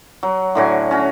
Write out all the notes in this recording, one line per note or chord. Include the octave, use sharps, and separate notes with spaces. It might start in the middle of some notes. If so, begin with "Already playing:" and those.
F#3
A2 D3 F#4 G#5
C#4 F#4